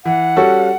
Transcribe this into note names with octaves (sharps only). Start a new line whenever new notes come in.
E3 F#5
G3 C#4 F#4 A4